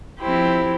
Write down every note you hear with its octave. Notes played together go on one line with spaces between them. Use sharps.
F3 C4 E4 G4 C5